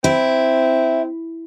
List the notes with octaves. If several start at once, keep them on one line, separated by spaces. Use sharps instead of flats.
C4 E4